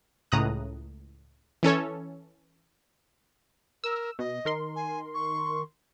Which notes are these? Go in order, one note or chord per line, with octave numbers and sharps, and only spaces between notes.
C#2 A2 A#5 D#6 F#6
E3 C#4 A4 C#5
A#4 E6
B2 D#5
D#3 A#4 C6
G#5
C#6